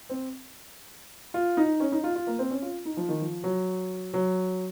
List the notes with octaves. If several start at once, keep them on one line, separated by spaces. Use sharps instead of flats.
C4
F4
D#4
C#4
D#4
F4
F4
A#3
C4
C#4
F4
D#4
F3
D#3
F3
F#3
F#3